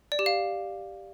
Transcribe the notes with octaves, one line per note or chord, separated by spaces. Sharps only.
D5
G4
F5